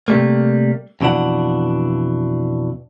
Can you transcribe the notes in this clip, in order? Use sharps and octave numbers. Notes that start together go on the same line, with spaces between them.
C3 F3 G3 A3 A#3
F2 B2 E3 D4 F#5